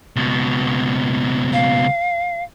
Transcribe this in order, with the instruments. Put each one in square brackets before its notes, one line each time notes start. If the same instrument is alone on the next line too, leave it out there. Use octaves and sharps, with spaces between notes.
[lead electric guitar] C#2 B2
[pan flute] F5